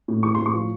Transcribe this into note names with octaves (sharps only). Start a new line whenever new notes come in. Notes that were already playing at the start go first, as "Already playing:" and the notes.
A2
E3 C#6
A2 C6
C#6
F3